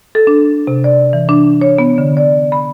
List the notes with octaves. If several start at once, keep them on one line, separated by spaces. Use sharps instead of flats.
A4
D4
C3
D5
E3
D4
C#5
B3
D3
D5
B5